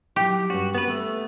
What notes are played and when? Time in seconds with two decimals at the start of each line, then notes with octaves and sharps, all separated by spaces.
0.16 F#3 E4 G4
0.50 G2 C#4 F#4 C#5
0.75 B3 C#4 B4
0.88 A3 B3